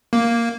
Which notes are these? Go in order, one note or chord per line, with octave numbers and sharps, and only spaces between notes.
A#3